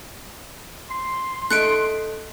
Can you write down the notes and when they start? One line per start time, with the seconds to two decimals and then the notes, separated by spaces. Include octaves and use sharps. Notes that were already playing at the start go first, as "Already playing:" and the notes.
0.90 C6
1.51 A3 D#4 F#6 C#7 D7